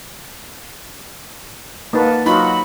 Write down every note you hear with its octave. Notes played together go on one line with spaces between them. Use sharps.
A#3 D#4 B4 F#5 A5
F#3 D#4 F4 F#4 B5